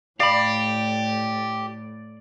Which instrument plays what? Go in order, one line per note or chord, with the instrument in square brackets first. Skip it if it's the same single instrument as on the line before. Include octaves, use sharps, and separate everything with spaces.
[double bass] A2 [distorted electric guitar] G4 [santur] D5 [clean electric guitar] F5 B5